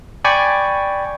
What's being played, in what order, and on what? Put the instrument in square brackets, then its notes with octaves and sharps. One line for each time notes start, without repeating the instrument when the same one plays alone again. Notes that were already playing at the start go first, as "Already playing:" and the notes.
[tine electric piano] D5 G5 G#5 B5 C#6